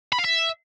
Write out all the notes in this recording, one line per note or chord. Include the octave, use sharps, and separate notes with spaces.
B5
F5
E5